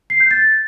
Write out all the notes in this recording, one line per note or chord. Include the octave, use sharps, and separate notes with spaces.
C7
G6
A6